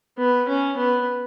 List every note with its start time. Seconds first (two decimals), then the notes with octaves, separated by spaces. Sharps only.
0.18 B3
0.48 C#4
0.77 B3